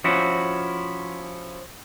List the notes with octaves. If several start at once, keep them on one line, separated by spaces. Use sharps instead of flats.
F3 C#4 E4 F#4